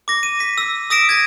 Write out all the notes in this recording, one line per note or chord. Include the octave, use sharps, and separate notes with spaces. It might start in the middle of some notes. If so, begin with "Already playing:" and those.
D6 A#6
D#7
B6
E6
D#6 E6 A#6 B6 D7 E7
G#6 A#6 D#7